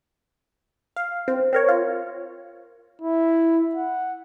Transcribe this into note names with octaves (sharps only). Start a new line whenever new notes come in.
F5
C4
C4 A#4 C#5
F4
E4
F#5